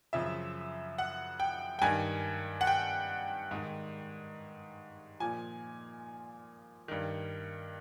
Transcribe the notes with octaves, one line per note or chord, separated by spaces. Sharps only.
F#2 C#3 F3 E5
F#5
G5
G5
G2 D#3 G#5
F#5
G5
G#2 D#3
A#2 F3 G#5
G2 D#3